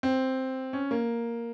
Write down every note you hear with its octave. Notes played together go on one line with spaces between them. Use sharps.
C4
C#4
A#3